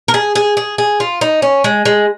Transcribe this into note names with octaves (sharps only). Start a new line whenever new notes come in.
A#4
G#4
G#4
G#4
G#4
F4
D#4
C#4
G#3
G#3